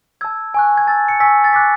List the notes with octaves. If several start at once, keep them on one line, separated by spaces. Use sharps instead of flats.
A5 E6 G#6
G#5 C#6 F#6
G#6
A5 E6 A6
C#7
G#5 C#6 E6 B6
A6
G#5 D6 F#6 B6